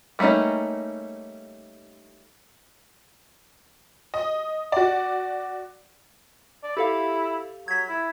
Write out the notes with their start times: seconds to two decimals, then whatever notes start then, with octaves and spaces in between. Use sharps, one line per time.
0.19 G3 A3 A#3 C#4 D#4
4.14 D#5
4.72 F#4 D5
6.63 D5
6.77 E4 G4 A4 F5
7.68 F#3 G#6 B6
7.89 E4